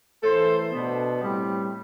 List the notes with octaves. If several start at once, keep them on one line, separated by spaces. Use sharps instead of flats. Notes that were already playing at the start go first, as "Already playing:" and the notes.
A2 E3 A3 A4 C5
B2 B3 D4
A2 G3 C4